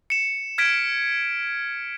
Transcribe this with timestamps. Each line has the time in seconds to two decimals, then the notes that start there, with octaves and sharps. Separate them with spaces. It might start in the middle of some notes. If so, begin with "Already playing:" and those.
0.10 C#7 E7
0.58 F6 G#6 B6 D7